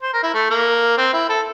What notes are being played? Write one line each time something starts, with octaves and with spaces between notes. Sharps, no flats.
C5
A#4
E4
A3
A#3
C4
E4
A4